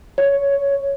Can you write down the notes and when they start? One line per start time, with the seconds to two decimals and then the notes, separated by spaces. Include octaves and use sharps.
0.18 C#5